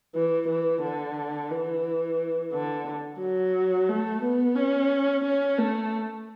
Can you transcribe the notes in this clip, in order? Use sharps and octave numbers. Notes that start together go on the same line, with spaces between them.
E3
E3
D3
E3
D3
F#3
A3
B3
C#4
C#4
A3